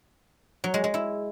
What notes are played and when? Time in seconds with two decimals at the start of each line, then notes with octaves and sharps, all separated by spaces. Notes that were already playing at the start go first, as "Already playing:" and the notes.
0.64 F#3
0.74 G#3
0.84 G#3
0.94 E4